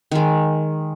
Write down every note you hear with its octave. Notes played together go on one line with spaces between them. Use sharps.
D#3 G#3